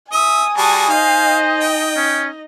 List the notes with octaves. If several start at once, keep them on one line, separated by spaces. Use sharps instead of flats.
E5 G#5 D#6
G3 F#4 G#4 A5 D#6
D#4 C5 D#5 F5
G5
C#4